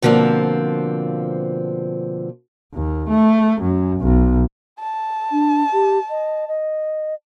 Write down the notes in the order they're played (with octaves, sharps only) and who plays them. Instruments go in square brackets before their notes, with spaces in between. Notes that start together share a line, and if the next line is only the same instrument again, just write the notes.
[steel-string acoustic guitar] B2 D3 F3 A#3 C4
[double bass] D#2
A3
F#2
B1
[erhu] A5
[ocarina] D4
G4
D#5
D#5